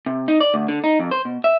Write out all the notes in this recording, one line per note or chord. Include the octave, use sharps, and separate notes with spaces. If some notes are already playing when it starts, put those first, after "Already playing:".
C3
D#4
D5
D2
D3
D#4
F2
C5
B2
E5